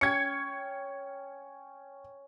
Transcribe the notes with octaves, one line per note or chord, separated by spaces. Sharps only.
C#4 G5 G#6 C#7